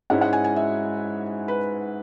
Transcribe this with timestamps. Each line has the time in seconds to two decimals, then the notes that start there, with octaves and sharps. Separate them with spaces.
0.10 G#2 G#3 C#4 E4 F#5
0.21 F#5
0.33 G#5
0.44 G#5
0.56 E5
1.48 B4